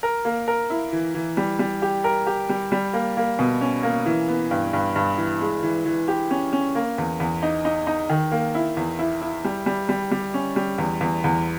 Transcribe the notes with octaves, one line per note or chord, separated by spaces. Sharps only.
A#4
A#3
A#4
E4
E3
E3
G3
G3
G4
A#4
G4
G3
G3
A#3
A#3
B2
C#4
A#3
E3
B3
G2
G2
G2
E3
G#3
E3
E3
G4
C#4
C#4
A#3
E2
E2
D#4
D#4
D#4
D#3
A#3
E4
E2
E4
E4
G3
G3
G3
G3
C#4
G3
E2
E2
E2